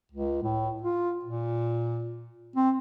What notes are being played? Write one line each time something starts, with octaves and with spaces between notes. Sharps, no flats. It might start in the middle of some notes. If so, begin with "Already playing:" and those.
C#2
A2
F4
A#2
C4